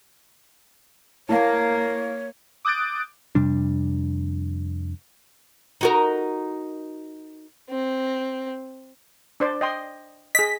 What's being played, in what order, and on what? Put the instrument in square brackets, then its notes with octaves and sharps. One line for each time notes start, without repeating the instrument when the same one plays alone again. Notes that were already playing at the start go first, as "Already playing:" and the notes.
[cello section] A#3 [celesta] E4 F5 [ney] C#5
[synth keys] D6 D#6 F#6 G6 A6 D7
[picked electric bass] F2 C3 G3 D4
[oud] D#4 F#4 A#4
[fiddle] C4
[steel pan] D4 C5 D5
D#5 G5 C6
[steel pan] G#4 D#5 [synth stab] B6